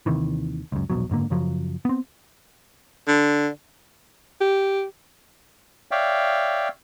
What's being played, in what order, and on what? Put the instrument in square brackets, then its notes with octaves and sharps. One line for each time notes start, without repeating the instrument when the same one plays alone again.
[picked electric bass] D#2 C3 D#3 E3
C#2 F#2
E1 A#1 B2 F#3
F#1 G#2 D3 A#3
F#2 C#3 F3 F#3
B3 C4
[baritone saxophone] D3
[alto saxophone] G4
[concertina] C#5 D5 E5 F5 G5